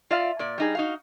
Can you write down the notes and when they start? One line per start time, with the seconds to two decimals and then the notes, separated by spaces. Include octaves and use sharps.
0.10 F4 D5 E5 F5
0.39 A#2 D5
0.58 G3 D#4 G#4
0.75 D#4 F#4 F5